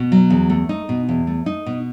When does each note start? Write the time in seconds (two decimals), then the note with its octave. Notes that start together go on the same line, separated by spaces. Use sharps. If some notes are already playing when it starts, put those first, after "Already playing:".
Already playing: B2
0.12 F#3
0.30 E2
0.50 A3
0.69 D#4
0.89 B2
1.09 E2
1.27 A3
1.46 D#4
1.66 B2